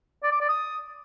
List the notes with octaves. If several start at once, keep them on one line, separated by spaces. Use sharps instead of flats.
D5
D6
D5
D#6